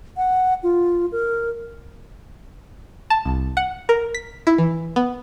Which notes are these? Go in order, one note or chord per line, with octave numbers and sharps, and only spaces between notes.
F#5
F4
A#4
A5
C2
F#5
A#4
B6
E4
E3
B3